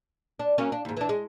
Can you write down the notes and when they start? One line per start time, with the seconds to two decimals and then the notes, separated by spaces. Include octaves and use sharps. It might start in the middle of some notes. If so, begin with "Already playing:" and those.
0.39 D4
0.58 F#3 A#3 C#4
0.72 D4
0.85 D#2 G#2
0.97 E3 D4
1.09 G#3